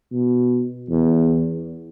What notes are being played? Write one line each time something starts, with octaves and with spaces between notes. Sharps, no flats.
B2
E2